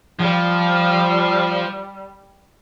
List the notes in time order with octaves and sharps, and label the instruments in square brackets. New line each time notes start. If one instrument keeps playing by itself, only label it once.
[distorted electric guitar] F3 [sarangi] G3